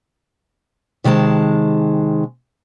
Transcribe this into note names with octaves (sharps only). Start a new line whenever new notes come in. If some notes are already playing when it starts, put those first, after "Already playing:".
C3 D#3 G#3 A5